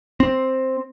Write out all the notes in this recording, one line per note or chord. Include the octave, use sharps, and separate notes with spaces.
C4